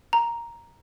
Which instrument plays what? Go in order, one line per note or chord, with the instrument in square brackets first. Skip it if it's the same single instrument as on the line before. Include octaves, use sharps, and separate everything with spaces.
[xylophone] A#5